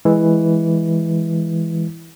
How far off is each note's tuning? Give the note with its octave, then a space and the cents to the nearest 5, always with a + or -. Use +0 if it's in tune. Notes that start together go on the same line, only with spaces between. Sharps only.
E3 +0 G#3 +0